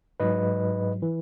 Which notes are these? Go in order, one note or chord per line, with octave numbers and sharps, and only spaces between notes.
G#2 F#3 B4 D#5
E3